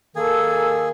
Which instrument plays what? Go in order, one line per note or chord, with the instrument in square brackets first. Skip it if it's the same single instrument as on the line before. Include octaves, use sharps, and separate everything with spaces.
[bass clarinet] D#3 [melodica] A#3 G#4 G#5 [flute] A4